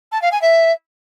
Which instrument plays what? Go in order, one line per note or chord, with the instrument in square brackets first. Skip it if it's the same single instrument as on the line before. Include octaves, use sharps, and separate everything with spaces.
[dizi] A5
F5
G#5
E5